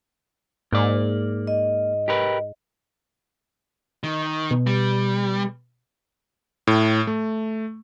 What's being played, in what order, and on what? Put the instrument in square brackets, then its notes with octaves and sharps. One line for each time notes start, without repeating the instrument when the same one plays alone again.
[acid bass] G#2 [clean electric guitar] A#3 D5
[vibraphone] D#5
[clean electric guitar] G4 A#4 B4
[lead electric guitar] D#3
[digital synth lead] B2
[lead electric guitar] G3
[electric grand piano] A2
A3